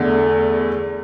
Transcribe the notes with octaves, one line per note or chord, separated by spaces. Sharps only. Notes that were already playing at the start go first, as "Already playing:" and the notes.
Already playing: E2 D3 A3